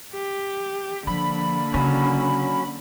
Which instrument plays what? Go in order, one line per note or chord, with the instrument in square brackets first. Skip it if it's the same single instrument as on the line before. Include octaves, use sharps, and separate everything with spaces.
[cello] G4
[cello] D3 A#3 [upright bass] F3 [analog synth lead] B5
[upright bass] C#3 [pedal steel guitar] F#3 C#4